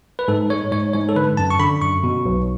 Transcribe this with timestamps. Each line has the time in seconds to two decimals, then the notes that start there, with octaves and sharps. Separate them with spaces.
0.19 B4
0.28 G#2 A4
0.50 G#3 C#5
0.72 G#2 C#5
0.93 G#2 C#5
1.09 A4
1.16 D3 B4
1.37 F#2 A5
1.50 C#6
1.59 D3 B5
1.81 F#2 C#6
2.04 B2
2.25 B1